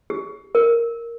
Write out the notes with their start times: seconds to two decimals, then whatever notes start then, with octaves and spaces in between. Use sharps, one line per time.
0.10 G4
0.55 A#4